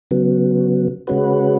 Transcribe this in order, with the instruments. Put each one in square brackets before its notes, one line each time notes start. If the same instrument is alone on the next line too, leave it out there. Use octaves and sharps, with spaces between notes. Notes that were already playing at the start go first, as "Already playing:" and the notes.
[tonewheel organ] C#3 F#3 B3
C#3 G#3 C#4 F#4 B4